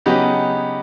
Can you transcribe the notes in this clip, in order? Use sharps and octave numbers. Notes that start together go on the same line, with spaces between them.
C#3 F#3 B3 D#4 G4